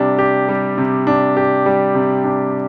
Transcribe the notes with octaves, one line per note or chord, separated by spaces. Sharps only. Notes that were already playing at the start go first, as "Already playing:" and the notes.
Already playing: C3 G3 D4 G4
G4
G3
C3
D4
G4
G3
C3
D4